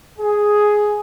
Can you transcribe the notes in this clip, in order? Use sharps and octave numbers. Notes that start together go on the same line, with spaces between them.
G#4